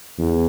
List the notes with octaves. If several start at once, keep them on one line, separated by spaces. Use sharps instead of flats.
E2